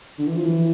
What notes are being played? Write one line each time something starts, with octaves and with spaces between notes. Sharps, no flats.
D3
E3
F3
E3